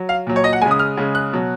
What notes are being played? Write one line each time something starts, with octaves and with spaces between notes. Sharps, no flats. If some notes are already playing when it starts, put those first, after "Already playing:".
Already playing: F#3
F5
A#2 F#3
C#5
D#5
F#5
C#3 G#3 G#5
D#6
F6
C#3 G#3
F#6
B2 F#3